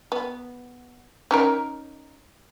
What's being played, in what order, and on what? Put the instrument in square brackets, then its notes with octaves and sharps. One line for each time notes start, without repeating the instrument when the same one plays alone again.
[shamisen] B3
C#4 D#4 A#4